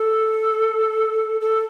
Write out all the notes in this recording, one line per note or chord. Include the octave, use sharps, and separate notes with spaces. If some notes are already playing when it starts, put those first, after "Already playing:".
Already playing: A4
A4